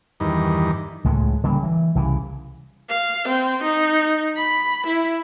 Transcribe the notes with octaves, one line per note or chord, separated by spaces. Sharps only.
E2 G2 D#3
C#2 A2 G#3
C#3 G3 A#3
E3
C2 C#3 E3
F5
C4
D#4
B5
E4